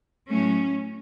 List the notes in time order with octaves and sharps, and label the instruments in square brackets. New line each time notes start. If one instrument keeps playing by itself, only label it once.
[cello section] A2 F#3 A3 C#4